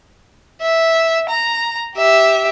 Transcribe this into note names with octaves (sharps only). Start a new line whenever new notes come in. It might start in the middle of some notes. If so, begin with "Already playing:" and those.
E5
A#5
G4 E5